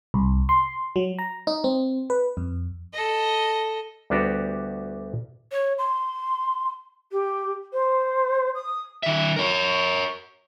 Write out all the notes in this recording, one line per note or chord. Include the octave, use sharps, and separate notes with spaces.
C2
C6
F#3
A#5
D#4
C4
B4
F2
A4 D#5
D2 G3 B3 D4 F#4 G4
C#5
C6
G4
C5
D#6
D#3 E5
A#4 C#5